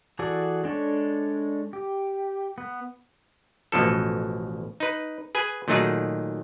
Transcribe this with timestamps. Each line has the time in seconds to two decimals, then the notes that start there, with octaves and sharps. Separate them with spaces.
0.19 E3 F#4 G#4 A4 D5
0.64 G#3 D4 A4 C#5
1.73 G4
2.58 B3
3.72 A1 B2 F3 A4
4.80 D#4 B4
5.35 G#4 B4 G#5
5.68 A#2 D#3 F#3 A3 D#4 G#4